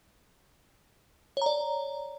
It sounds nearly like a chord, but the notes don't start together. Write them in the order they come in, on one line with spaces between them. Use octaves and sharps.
C#5 A#5 D5